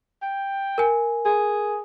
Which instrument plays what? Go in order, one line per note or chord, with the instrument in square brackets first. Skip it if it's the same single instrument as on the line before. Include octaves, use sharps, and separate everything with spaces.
[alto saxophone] G5
[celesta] A#4 G#5
[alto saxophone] G#4